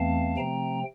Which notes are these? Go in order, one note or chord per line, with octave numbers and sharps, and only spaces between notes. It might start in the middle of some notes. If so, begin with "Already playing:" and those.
Already playing: E2 E3 A3 C4 F5 A5
C3 F3 A3 C4 G5 A#5